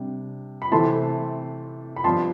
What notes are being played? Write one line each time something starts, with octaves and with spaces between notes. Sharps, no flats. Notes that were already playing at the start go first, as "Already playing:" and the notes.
Already playing: C3 G3 D4
B5
C3 E3 A3 C4 E4 A5 C6
B5
G2 F3 B3 D4 A5 C6